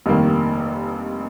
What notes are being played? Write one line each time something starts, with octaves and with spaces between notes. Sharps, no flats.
F1 G2 D#3 A#3